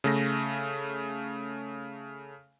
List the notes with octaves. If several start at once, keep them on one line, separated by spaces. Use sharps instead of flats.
C#3 A3 A#6